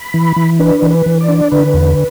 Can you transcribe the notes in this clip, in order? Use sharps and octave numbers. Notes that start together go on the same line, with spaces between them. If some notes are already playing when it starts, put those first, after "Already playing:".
Already playing: B5
E3
E3
D4 B4
E3
B4
E3
D5
D4
D3 B4
E2